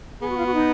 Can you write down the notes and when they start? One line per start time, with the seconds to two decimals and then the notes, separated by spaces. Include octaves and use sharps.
0.21 B3 G#4
0.30 F#4
0.37 F4
0.45 F#4
0.54 D#4